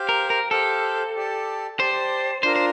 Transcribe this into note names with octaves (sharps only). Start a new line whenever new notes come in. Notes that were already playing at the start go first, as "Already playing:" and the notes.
Already playing: G4 C5 F5
A#4
A#4
G4 A4 C5 F5
G4 D5 A5
G4 C5 D5 A5
D4 F4 A#4 C5
C5